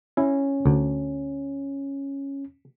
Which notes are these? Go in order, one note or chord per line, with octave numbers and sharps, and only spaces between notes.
C#4 E4
D2